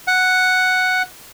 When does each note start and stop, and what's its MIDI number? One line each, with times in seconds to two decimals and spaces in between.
0.07 1.02 78